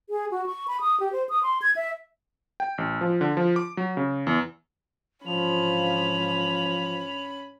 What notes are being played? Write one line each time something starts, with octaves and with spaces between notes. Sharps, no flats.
G#4
F#4
C#6
B5
D#6
G4
C5
D#6
C6
G#6
E5
G5
A1
F3
D3
F3
D6
F#3
C#3
E2
G#2 D3 E3 F3 C#4 B5 F7